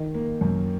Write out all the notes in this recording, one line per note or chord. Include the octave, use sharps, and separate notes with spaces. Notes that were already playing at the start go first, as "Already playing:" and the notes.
Already playing: D#3
A#3
F#2